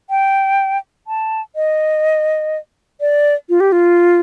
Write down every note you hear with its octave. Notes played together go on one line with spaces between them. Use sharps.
G5
A5
D#5
D5
F4
G4
F4